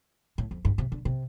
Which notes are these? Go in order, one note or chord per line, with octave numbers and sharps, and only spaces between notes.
A2
F2
G2
C3
D3
C3